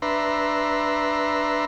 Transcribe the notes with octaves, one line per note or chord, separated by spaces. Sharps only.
D4 B4 E5 A#5 C6